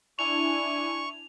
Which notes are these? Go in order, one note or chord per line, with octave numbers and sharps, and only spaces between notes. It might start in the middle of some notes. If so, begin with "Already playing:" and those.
D4 E4 G#5 C#6 F7